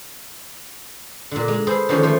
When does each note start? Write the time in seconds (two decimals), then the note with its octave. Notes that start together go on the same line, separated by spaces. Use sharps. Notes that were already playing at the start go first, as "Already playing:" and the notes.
1.31 A#2 D3
1.48 G#3
1.67 G#4 A4 B4 C5
1.89 D3 D#3 F3 C#4 F4 C#5
2.02 A3 F4 C5